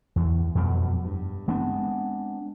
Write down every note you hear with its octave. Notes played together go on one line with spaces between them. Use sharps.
E2
F2 B2 F#3 G3
G2
G#3 B3 C4 D4